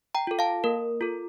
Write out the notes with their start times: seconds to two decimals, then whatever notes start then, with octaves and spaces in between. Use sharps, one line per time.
0.15 G5 A#5
0.27 F4 A4
0.39 F5 A5
0.64 A#3 A#4
1.01 F4 A4